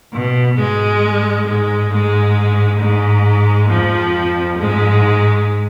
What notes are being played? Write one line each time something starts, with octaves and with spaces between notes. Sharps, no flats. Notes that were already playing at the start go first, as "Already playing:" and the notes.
B2
G#2 G#3
G#2 G#3
G#2 G#3
G#2 G#3
F2 F3
G#2 G#3